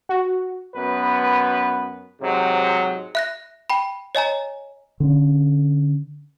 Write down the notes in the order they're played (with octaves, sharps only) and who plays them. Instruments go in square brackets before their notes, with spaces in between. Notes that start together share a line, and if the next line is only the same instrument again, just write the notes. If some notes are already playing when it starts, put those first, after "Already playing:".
[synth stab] F#4
[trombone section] F#2 B3 B4
G#2 C3 F#3
[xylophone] E5 F#6 A#6
G5 B5
C#5 D#5 G#5 A#5
[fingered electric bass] D3 C4 C#4